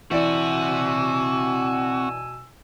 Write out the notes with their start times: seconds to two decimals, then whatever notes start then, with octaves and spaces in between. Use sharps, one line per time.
0.11 B2 E3 C4 F#4 D5 E5 G#5 E6